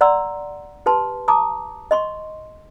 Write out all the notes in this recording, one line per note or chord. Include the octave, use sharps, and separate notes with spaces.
D5 F#5 A#5 C6 E6
G4 B4 A5 C6
A5 A#5 D6 D#6
D#5 C6 C#6